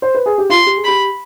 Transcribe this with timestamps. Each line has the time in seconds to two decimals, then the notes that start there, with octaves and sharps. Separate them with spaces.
0.02 C5
0.15 B4
0.26 G#4
0.38 G4
0.50 F4 C6
0.66 G4
0.76 G#4
0.84 G4 B5